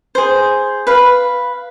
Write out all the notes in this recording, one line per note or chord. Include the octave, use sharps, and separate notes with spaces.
G#4 C5
B4 F5